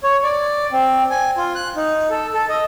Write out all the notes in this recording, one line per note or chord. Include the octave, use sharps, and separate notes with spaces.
C#5
D5
C4
G#5
F4
F#6
D#4
A4
A4
D#5